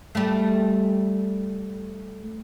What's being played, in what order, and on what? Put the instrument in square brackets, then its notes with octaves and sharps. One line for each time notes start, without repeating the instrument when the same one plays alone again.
[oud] G3 A3